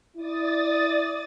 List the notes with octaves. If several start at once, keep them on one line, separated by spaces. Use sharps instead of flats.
E4 D5 D#6 A6